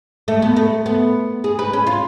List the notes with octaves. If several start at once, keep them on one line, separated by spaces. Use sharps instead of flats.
A3
B3
A3
B3
G#4
B4
C#4
F4